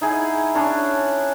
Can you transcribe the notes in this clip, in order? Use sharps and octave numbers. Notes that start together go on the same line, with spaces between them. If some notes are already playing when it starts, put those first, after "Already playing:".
D#4 E4 G#4 F#5
C#4 D4 C#5